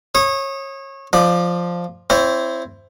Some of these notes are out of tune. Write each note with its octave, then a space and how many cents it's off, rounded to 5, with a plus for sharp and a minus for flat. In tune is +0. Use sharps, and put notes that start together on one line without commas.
C#5 -25 D#6 +0
F3 +0 D5 +20
C4 +0 E4 +15 C#5 +40